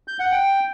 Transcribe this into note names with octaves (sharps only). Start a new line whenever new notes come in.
G6
F#5
G5